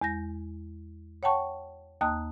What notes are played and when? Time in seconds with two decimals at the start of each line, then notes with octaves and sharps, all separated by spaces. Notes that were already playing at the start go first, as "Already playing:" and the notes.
0.01 E2 G#3 G6 A#6
1.23 C#5 F#5 G5 A5 C#6
2.01 D#2 A#3 D#5 A5 D#6 F#6